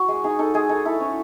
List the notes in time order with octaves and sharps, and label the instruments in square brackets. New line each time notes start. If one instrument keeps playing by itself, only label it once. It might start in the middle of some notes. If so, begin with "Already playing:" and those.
Already playing: [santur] F#4
G#3
D#4 G#4
D#4 A4
G#3 G#4
D#4 A4
E4 A4
C#4